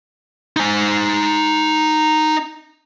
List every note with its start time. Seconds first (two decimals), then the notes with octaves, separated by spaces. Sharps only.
0.56 D#4 G#5